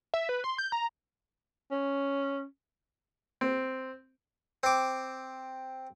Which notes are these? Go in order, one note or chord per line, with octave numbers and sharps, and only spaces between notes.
E5
B4
C6
G6
A#5
C#4
C4
C4 D6